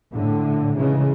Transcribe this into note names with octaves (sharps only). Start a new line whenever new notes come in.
A2 D3
C#3 E3 G#3